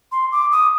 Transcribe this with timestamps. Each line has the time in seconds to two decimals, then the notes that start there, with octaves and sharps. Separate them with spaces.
0.12 C6
0.32 D6
0.52 D#6